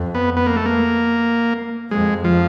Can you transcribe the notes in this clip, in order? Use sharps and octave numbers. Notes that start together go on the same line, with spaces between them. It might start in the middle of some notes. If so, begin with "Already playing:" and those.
Already playing: F2
B3
B3
A#3
A3
A#3
F2 G#3
F3